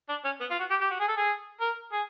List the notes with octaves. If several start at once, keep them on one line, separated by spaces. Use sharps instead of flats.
D4
C#4
B3
F4
F#4
G4
G4
F#4
G#4
A4
G#4
A#4
G#4